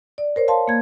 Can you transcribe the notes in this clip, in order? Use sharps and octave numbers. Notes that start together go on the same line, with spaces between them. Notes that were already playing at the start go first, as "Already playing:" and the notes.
D5
A#4 C5 C#5
F5 A5 C6
A#3 G#6